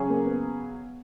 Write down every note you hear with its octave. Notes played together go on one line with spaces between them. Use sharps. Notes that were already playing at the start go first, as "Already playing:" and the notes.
Already playing: C#3 F#3 C#4 G#4
A#3
B3